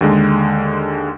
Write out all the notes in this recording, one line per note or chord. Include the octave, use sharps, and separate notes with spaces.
D#2 D3 G#3